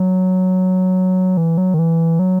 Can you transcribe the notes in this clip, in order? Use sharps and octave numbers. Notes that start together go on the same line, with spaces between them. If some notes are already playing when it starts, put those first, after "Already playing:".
Already playing: F#3
E3
F#3
D#3
E3
F#3